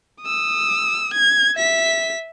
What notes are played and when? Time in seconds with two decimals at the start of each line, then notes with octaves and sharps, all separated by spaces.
0.22 D#6 E6
1.14 G#6
1.56 E5 B6